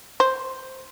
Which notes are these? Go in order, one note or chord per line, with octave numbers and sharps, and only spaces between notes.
C5